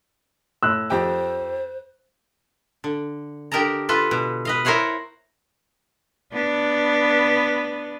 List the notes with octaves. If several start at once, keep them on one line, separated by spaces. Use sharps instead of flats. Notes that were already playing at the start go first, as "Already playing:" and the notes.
A2 E6 F#6
F2 G4 C5 G5
D3
D3 G4 A#4 D#5 A5 A#5
F4 A4 B4
B2
B4 D#5 F5
E4 A#4 C5 C#5 F5 F#5
B3 D4